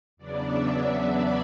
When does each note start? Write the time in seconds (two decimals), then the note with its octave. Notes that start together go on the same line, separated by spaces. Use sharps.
0.17 E2 C#3 F#3 B3 D4 D5
0.47 E5
0.78 D5
1.08 B5